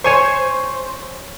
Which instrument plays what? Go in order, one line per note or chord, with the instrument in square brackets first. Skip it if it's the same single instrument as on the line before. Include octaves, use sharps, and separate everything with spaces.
[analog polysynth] C5 [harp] C#5 G#5 C#6